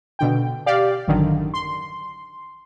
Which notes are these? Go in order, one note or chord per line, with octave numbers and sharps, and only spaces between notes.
B2 D3 G5
G4 D5 F5
A1 F#2 D3 D#3
C6